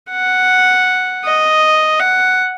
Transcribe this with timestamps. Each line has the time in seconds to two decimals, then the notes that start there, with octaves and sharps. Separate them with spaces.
0.11 F#5
1.25 D#5
2.00 F#5